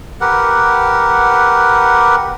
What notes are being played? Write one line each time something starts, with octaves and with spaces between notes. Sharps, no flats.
G4 A#4 B4 F#5